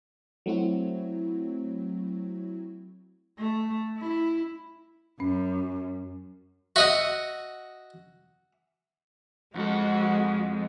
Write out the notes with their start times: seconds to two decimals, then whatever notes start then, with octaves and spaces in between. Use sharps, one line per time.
0.46 F#3 A3 C4 E4 F#4
3.38 A3
3.98 E4
5.20 F#2 C#4
6.76 F#4 D#5 E5 F#5
9.55 F2 G#3 F#4 A4